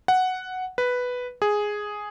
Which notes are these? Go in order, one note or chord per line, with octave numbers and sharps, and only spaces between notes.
F#5
B4
G#4